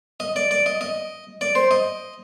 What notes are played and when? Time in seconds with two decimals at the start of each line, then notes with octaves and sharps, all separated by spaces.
0.20 D#5
0.36 D5
0.51 D5
0.66 D#5
0.81 D#5
1.41 D5
1.55 C5
1.71 D#5